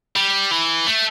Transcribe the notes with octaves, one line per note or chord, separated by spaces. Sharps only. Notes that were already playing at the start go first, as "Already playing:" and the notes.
G3
E3
A3